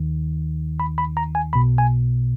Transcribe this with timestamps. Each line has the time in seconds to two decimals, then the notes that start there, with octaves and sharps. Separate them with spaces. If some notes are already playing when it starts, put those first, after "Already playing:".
Already playing: D#2 D#3
0.80 B5
0.98 B5
1.17 A#5
1.35 G#5
1.53 B1 B2 B5
1.78 G#5